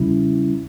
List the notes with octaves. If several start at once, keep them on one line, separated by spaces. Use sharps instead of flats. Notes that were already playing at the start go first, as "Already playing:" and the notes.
Already playing: E2 C#3 G3 C#4 E4